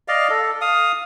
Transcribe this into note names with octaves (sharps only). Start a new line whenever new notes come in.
D5 D#5 F5
A4
F5 D#6